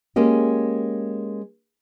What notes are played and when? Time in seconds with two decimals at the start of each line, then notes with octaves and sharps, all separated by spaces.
0.16 G#3 A#3 C#4 G4